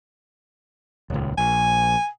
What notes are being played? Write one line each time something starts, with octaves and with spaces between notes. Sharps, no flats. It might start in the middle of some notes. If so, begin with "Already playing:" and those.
D#1 C#2
A#1 G#5